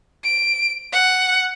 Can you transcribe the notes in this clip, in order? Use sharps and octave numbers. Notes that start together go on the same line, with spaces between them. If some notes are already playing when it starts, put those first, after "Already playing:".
D7
F#5